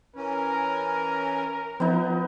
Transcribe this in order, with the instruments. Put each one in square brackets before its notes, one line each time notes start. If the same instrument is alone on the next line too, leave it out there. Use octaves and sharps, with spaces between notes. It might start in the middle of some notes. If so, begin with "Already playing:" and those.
[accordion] E3 C#4 [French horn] A#4
[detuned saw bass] F3 [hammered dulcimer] B3 D#4